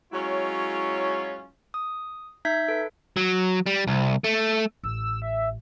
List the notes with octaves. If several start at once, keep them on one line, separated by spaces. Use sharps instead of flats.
F#3 G#3 C#4 E4 F4 C#5
D#6
D#4 E5 G6 G#6 B6
A4 B4
F#3
G3
C2
A3
A1 E6
E5